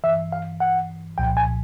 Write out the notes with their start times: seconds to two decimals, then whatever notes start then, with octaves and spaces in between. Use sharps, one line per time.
0.04 G2 E3 E5
0.32 F5
0.60 F#5
1.18 C2 A#2 F3 G5
1.37 G#5